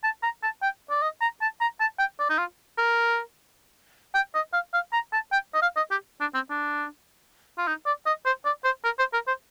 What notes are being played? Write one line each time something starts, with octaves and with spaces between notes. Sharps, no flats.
A5
A#5
A5
G5
D5
D#5
A#5
A5
A#5
A5
G5
D5
D#4
F4
A#4
G5
D#5
F5
F5
A#5
A5
G5
D#5
F5
D#5
G4
D4
C4
D4
F4
D#4
D5
D#5
C5
D5
C5
A#4
C5
A#4
C5